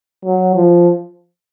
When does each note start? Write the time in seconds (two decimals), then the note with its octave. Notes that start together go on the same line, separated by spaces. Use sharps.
0.25 F#3
0.56 F3